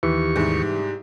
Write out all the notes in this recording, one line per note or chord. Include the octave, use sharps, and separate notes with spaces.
D#2 E3 G4 C#6
C2 G#2